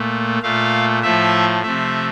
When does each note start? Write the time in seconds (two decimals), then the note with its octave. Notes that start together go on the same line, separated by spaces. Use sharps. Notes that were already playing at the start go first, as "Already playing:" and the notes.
Already playing: A#2 A3
0.42 A#2 A3 F5
1.03 A2 F3 A3 E5
1.63 C3 F3 A3 E5